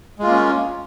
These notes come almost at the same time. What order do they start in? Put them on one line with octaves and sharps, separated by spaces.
G#3 F4 A#3 C#4